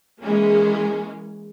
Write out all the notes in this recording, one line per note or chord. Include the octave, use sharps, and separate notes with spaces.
E3 G#3 A#3 C#4